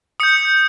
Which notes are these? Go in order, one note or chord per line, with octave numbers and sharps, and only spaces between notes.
D#6 G6 C#7